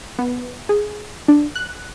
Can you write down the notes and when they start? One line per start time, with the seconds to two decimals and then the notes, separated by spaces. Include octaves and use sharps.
0.19 B3
0.69 G#4
1.28 D4
1.55 F#6